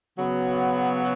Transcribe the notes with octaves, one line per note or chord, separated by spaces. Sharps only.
C#3 F#3 B3